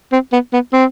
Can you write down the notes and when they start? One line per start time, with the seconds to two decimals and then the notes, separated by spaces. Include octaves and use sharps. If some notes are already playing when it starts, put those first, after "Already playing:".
0.12 C4
0.33 B3
0.53 B3
0.73 C4